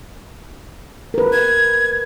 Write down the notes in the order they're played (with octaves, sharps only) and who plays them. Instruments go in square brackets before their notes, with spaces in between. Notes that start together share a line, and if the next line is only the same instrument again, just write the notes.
[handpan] A#4 B4
[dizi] G#6